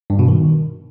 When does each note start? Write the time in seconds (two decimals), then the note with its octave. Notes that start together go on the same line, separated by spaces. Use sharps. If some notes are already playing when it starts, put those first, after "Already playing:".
0.10 G2
0.19 B2
0.28 D#3